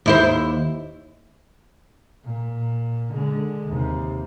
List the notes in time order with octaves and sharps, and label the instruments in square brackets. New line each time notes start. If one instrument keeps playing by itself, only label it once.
[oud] D#2 E4 C5
[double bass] A#2
D3 G#3
D#2 C3